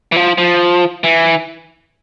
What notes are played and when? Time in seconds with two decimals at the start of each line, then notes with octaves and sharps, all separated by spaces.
0.12 E3
0.16 F3
0.38 F3
1.04 E3